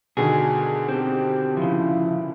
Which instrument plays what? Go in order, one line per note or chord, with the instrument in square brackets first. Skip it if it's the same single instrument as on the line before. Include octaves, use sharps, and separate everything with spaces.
[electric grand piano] B2 D3 D#3 [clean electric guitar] G#4
[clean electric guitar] C4 [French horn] G4
[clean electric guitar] C#3 F3 [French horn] E4